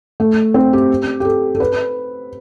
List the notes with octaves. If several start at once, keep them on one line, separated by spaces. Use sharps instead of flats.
A3
C4
G4
G4
A4
A4
B4